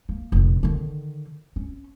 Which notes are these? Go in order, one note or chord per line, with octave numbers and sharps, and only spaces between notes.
A#3
F1 A#1
D3 D#3
C#4